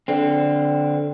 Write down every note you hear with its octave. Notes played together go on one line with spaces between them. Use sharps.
D3 C4